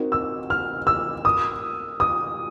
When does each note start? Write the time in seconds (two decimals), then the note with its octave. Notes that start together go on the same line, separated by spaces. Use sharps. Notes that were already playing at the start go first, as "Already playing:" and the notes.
Already playing: C4 D#4 F#4 A#4
0.12 E6
0.50 F6
0.87 E6
1.25 D#6
2.00 D#6